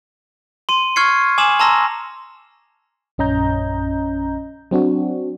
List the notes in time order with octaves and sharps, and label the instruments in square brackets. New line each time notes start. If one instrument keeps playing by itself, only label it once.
[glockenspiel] C6 D#7
C#6 F6 G#6 C7 C#7
G#5 D6 D#6 E7 F#7
A5 A#5 C6 E6 A#6
[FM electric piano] A#1 F#2 C#4 D#5 A#5 G6
F#3 C4 D4 F#4